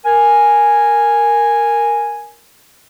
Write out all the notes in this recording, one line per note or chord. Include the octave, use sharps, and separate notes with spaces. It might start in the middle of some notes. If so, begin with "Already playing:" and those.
A#4 G#5